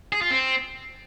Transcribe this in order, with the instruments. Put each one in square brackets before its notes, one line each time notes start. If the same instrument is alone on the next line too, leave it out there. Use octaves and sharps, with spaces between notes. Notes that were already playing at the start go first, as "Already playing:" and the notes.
[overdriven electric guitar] G#4
F4
C4